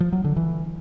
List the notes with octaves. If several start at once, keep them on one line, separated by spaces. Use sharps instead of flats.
F3
F#3
D3
E3